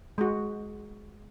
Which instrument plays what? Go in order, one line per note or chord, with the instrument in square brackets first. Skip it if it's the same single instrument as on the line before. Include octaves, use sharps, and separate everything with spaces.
[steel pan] G#3 F#4